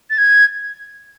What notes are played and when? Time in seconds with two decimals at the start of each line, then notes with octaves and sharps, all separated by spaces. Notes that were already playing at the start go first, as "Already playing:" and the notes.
0.10 A6
0.18 G#6